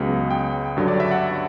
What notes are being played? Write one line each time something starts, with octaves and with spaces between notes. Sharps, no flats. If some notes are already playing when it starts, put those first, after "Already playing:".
Already playing: C#2 C#3 F#3 B3
G5
G2 D3 F#3
D5
E5
F#5